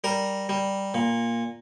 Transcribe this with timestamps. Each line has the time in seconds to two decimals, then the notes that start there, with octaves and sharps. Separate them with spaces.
0.04 G3 A#4
0.49 G3
0.94 A#2